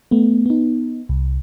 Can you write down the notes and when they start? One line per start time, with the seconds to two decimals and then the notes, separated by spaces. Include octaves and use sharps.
0.11 A3 B3
0.46 B3 D#4
1.09 C2